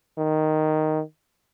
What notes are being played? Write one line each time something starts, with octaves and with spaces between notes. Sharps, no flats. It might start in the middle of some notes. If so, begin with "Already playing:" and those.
D#3